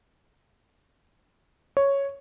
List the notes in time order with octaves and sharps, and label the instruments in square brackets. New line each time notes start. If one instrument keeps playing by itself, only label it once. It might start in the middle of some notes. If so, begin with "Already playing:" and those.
[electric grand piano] C#5